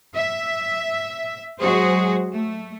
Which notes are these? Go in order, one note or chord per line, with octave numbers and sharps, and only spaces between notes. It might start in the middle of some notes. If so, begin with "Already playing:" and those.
E5
F#3 G#3 F#4 G#4 C5
A3